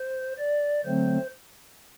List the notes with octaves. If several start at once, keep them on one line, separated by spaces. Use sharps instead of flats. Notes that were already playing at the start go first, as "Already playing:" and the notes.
Already playing: C5
D5
D3 F#3 A3 C4 C5